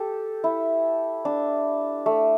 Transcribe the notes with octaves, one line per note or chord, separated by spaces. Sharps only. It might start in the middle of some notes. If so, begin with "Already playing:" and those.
Already playing: G4 A4
E4
D4
A3